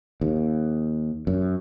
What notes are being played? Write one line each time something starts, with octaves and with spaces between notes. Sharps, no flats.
D#2
F#2